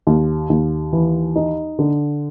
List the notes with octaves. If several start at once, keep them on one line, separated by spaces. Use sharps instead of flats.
D#2
D#2
E3
D#4
D3